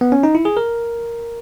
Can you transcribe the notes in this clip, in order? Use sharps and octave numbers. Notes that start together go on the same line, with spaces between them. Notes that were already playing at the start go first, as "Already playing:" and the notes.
B3
C#4
D#4
E4
G#4
A#4